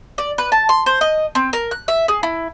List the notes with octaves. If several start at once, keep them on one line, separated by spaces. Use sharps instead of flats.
D5
B4
A5
C6
C5
D#5
C4
A#4
F#6
E5
G#4
E4